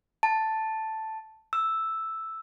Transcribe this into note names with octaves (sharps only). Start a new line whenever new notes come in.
A5
E6